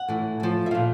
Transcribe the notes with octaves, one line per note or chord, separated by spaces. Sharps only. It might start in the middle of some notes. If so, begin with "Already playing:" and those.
Already playing: F#5
A2 E3
A2 F3
E5
A#2 F3 F5